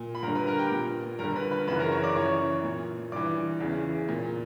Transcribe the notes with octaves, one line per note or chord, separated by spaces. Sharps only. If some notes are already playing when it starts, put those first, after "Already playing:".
Already playing: A#2
B5
G2 A#4 A#5
D3
B4 B5
A#4 A#5
G4 G5
A#2
G2 D3 A#4 A#5
B4 B5
B4 B5
F#2 C#3 E3 B4 B5
A#4 A#5
C#5 C#6
D5 D6
F#2 E3 C#5 C#6
A#2
G2 E3 D5 D6
E2 C#3 E3
A#2